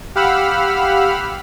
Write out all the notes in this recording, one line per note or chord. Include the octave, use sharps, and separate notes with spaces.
G4 F5 F#5 B5 E6 F6